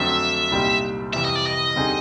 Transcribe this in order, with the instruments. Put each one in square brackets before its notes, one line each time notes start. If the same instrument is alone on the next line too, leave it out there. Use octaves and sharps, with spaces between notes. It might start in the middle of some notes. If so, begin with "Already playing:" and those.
Already playing: [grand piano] F2 D3 F#3 A3 C4 [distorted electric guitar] E5
[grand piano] C2 A#2 G3 C4 D#4
[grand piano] F2 C3 E3 G3 [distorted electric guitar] E5
[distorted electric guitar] D#5
D5
D#5
[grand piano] D3 G3 C4 D#4 G#4